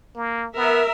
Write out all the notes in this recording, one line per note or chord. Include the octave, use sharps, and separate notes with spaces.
A#3
B3 A#4 E5